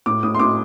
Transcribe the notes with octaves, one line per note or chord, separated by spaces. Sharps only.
A2 D6
A2 D#6
C6
A2 D6